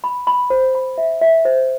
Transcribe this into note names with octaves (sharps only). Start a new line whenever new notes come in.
B5
B5
C5
B5
E5
E5
C5